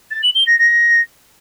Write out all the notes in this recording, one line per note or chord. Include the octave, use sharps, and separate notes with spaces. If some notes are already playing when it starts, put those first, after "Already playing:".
A6
F#7
G7
A#6
A#6